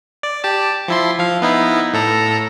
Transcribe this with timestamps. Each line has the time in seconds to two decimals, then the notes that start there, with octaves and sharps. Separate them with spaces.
0.23 D5
0.44 G4 A5
0.88 F3 E4 C6
1.18 F3 F5
1.42 B3 D#4 E4
1.94 A2 A4 A#5